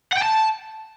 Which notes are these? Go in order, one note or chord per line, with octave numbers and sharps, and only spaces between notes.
F#5
G5
A5